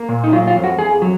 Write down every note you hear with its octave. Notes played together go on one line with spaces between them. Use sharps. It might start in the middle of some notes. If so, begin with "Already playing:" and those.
Already playing: A#3
A#2
D#4
F#3 F4
F4
F2
F#4
F2 G#4
F#3